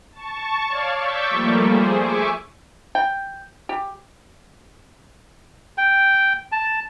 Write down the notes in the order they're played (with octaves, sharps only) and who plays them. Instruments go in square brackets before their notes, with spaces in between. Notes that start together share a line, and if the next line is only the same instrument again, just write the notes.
[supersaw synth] A5 C#6
C#5 D5 F5 G#6
C#6 D6 E6 G6 A6 B6
F3 G3 A3 A#3
G#4 C5
E5 G#5 C#6 D6
[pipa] G5
G4
[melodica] G5
A5